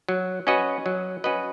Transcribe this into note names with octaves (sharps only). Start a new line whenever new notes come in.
F#3
C#4 F#4 B4 D#5
F#3
C#4 F#4 B4 D#5